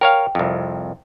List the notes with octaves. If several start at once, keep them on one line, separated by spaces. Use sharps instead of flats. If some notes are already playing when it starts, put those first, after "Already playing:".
A#4 C#5 F5 G5
C2 F2